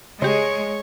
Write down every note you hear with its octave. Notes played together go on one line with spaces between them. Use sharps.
C#3 G#3 G4 C#5 C#6